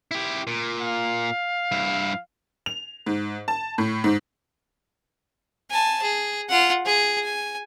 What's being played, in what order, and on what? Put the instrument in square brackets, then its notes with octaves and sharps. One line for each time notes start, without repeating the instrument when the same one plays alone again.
[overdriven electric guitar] E4 G4
A#2
[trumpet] F5
[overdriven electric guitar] G2 E4
[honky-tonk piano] F7
G#2
A5
A2
G#2
[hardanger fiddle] G#5 A5
G#4
F4 F#5
G#4
G#5